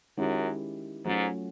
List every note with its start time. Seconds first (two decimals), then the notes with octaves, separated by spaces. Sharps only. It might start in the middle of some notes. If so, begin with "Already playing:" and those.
0.17 F#2 D#3 G#3 C#4 E4 G4
1.05 G#2 F#3 A3 C#4 F4